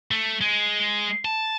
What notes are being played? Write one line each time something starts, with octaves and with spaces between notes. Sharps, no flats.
A3
G#3
A5